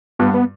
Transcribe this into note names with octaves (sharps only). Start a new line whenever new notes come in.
G2 B3
B3